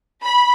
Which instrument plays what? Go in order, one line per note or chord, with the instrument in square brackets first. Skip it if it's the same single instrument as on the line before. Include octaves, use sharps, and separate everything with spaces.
[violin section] B5